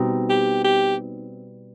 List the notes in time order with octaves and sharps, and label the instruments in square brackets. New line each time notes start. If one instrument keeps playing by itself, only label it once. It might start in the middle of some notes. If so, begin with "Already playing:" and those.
Already playing: [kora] B2 G3 C4 D#4
[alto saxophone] G4
G4